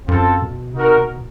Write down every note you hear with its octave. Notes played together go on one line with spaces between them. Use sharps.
F#2 C4 F4 A4
B2
C3 D#4 F#4 A#4
B2